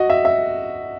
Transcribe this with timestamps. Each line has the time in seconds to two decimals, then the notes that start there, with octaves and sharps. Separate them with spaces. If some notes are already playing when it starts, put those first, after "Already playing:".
Already playing: F#4 D#5
0.10 E5
0.25 E5